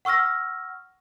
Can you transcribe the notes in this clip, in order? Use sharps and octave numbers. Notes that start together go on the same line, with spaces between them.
F#5 C#6 E6 F6 A#6